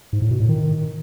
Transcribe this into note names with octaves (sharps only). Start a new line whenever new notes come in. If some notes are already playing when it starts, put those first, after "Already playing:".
G#2
A2
B2
A2
D#3